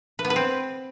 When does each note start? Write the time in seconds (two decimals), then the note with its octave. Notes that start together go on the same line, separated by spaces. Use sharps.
0.19 B4
0.25 B3
0.30 B4
0.36 C4